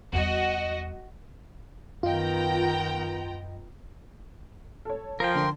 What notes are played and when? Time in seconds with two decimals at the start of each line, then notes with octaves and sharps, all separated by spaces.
0.13 E2 G3 F#4 D#5
2.03 F#2 D#3 B3 F4 D#5 G5 A#5
4.85 A4 C#5
5.20 F3 A#4 G5
5.35 D3 C6